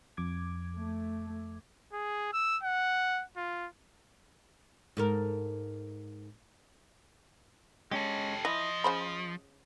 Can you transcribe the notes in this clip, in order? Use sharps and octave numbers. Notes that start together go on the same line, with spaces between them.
F2 D6 G#6
A3
G#4
E6
F#5
F4
G#2 A4 A#4
G#3 C#4 G4 A4
E3 F3 E4 D#5
C#3 C5 B5